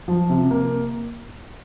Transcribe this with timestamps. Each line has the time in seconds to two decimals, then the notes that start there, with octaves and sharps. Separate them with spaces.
0.08 F3
0.29 C3
0.51 A#3